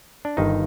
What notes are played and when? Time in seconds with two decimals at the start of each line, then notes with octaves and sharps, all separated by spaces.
0.25 D4
0.37 G1 G2 D#3 D#4